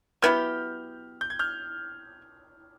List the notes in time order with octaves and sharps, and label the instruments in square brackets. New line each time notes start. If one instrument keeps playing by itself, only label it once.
[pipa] F#3 B3 E4 G4 [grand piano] F6 G6
[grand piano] G6
G#6
F6 G6